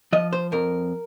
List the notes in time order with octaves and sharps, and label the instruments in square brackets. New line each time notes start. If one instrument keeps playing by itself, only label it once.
[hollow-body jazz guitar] F3 D#5
C5
F2 A#4